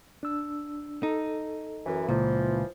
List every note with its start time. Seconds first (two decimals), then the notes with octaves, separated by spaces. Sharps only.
0.23 D4 E6
1.03 D#4 A4
1.86 F#2 E3
2.09 C#2 A#2 E3 F3